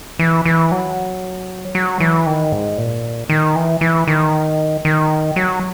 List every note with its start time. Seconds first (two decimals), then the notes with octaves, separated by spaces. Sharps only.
0.19 E3
0.45 E3
0.72 F#3
1.75 F#3
2.00 E3
2.26 D#3
2.52 G#2
2.78 A#2
3.30 D#3
3.56 E3
3.81 E3
4.08 D#3
4.85 D#3
5.36 F#3